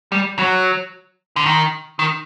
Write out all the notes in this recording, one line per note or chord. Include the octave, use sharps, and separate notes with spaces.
G3
F#3
D3
D#3
D#3